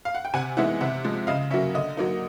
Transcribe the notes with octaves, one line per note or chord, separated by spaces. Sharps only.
F5
F#5
G5
C3 F#5 G#5
E3 G#3 B3 D#4 E5 F#5
C3 E5 F#5
F3 G#3
C#3 D#5 F5
F#3 A#3 C#4 E5
D3 D#5
F#3 A#3 D#4